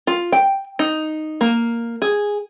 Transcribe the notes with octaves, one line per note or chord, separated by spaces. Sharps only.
F4
G5
D#4
A#3
G#4